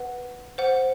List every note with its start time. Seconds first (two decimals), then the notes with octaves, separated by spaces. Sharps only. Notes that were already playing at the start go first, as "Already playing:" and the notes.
Already playing: B4 F#5
0.58 C5 F#5